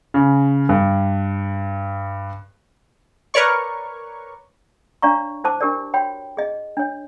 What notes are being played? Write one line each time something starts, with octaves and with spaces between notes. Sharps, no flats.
C#3
G2
A#4 B4 C#5 D5 C#6
D4 C#5 D5 F5 A#5 C#6
E4 C5 A5 D6
D4 G4 A#4 D5
F#4 C#5 G5 B5
G#4 D#5
D4 C#5